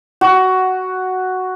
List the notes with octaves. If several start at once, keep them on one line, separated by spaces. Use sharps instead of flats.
F#4